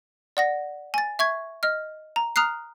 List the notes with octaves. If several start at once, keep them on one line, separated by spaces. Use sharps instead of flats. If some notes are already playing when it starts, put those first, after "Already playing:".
D5 F#5 A#6
G#5 A6
E5 C#6 G#6
D#5 F6
A#5
A#5 D#6 F6 F#6 C7